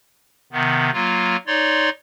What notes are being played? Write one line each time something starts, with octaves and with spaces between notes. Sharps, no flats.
C3 D#3 B3
F#3 A#3 F4
D#4 C#5 D5 C6